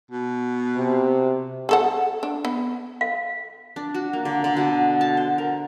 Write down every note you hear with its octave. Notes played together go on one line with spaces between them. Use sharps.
B2
C3
G#4 A4 F#5
D4
B3
F5
D4
F#4
A#3
D3
D3
B2
A5
C5
A#4